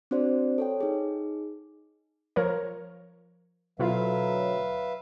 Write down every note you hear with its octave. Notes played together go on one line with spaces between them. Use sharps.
C4 D4 F#4 C5 D5
A4 C#5 G5
D#4 G#4
F3 A#4 C#5
D2 B2 F#3 E4 F4 B4 E5 F5